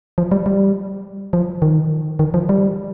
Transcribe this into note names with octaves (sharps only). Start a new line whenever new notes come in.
F3
G3
G3
F3
D#3
D#3
F3
G3